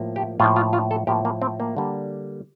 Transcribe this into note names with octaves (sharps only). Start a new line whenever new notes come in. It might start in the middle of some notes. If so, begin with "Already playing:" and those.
Already playing: A2 F3 A#3
G4
A2 F3 A#3 F4
F4
F4
A4
A2 F3 A#3 G4
A#3
C4
A#3
D3 G3 A#3